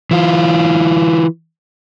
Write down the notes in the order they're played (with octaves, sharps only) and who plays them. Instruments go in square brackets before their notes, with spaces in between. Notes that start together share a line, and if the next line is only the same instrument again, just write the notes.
[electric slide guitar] E3 F4